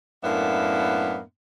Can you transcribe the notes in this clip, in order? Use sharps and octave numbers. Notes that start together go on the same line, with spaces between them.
F#2 A2 A#3 B3 D4 E5